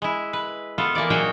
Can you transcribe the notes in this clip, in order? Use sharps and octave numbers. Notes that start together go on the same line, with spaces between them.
G#3 E4
B4
B3 F4 A4
E3 A#3 E4 D5
A#2 F#3 D#4 F#4 G#4 G5